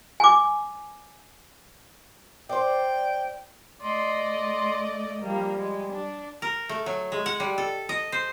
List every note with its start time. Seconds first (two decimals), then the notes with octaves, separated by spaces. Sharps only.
0.20 G#5 D6
2.49 C5 D5 G5
3.80 A3 D5 D#5 C6
5.21 F3 G3 A#3
5.58 G#3
5.91 D4
6.42 A#4
6.69 A3
6.86 F#3
7.12 G#3
7.26 F#5
7.40 G3
7.58 A4
7.89 D#5
8.12 C5